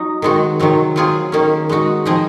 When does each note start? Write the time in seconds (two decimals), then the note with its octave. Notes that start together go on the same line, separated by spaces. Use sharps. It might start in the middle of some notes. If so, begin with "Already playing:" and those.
Already playing: F#3 D#4
0.22 D#3 G#3 C4 F#4
0.60 C3 D#3 F#3 C4
0.96 F#3 C4 F4 G#4
1.32 D#3 A#3 C#4
1.69 G#3 D#4 F#4
2.05 F3 C4 D#4 G#4